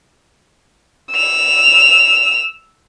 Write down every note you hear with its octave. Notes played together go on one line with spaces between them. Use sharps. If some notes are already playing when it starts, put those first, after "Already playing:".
E6 F7